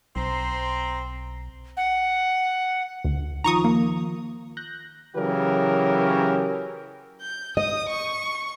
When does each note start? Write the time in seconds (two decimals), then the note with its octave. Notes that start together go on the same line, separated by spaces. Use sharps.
0.16 B1 C4 C5 A#5
1.77 F#5
3.04 D2
3.44 D#3 F3 F4 A#5 C#6 D#6
3.64 A#3
4.57 F#6 G6 A#6
5.16 C#3 E3 F#3 C#4 G4 A#4
7.21 G6
7.57 D#5 D#6
7.89 C#6